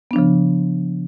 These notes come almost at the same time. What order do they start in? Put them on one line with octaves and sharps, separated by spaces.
B3 D4 F3 C#3